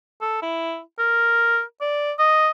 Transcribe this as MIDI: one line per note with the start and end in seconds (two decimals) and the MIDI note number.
0.21 0.38 69
0.43 0.80 64
0.99 1.62 70
1.81 2.13 74
2.19 2.51 75